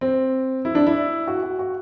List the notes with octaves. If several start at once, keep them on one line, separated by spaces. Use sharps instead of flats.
C4
E4
D4
E4
F#4
F#4
F#4